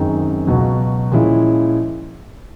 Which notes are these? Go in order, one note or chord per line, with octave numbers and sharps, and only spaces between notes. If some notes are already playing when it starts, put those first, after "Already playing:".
Already playing: F#2 D#3 G#3 C4 D#4
C#2 B2 F#3
A#2 F3 G#3 C#4 E4